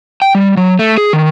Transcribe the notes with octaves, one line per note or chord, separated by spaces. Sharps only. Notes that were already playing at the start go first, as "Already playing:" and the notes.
G5
G3
F#3
A3
G#4
D#3